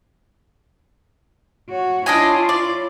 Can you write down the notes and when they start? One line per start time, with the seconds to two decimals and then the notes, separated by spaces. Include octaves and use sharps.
1.70 F#4 C#5
2.06 D4 E4 F4 C#5 D#5 G#5
2.49 D5